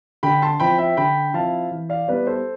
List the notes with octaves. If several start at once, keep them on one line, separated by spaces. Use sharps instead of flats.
D3 G5 B5
A5 C6
F3 C4 E4 G5 B5
E5 G5
D3 G5 B5
F3 C4 E4 F5 A5
E3
D5 F5
G3 B3 E4 B4 D5
A4 C5